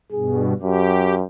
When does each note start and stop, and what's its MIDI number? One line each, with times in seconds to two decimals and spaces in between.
0.12 0.53 43
0.12 0.53 47
0.12 0.44 68
0.62 1.23 42
0.62 1.14 67